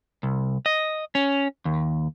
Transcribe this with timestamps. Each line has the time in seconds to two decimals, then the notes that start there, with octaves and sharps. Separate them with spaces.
0.23 C2
0.66 D#5
1.15 C#4
1.65 D#2